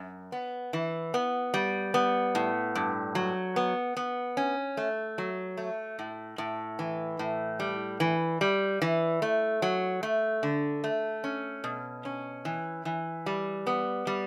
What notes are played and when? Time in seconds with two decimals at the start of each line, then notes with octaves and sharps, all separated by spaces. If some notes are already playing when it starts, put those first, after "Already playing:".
Already playing: F#2
0.32 B3
0.73 E3
1.14 B3
1.54 G3
1.94 B3
2.35 A2
2.75 G2
3.15 F#3
3.56 B3
3.97 B3
4.37 C#4
4.77 A3
5.18 F#3
5.57 A3
5.99 A2
6.38 A2
6.79 E3
7.19 A2
7.60 G3
8.00 E3
8.41 G3
8.82 E3
9.22 A3
9.62 F#3
10.03 A3
10.43 D3
10.84 A3
11.24 C#4
11.64 B2
12.05 C#4
12.45 E3
12.85 E3
13.26 G3
13.67 B3
14.07 G3